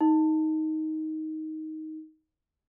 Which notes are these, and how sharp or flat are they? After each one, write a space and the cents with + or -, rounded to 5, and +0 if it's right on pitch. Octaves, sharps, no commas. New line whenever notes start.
D#4 +10